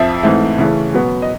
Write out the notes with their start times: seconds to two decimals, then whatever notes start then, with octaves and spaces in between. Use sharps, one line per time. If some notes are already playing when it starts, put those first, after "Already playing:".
Already playing: F2 F3 E5
0.23 G#2 E3 A3 C4
0.58 C#3 E3 A3 C#4
0.94 B2 F#3 B3
1.22 D#5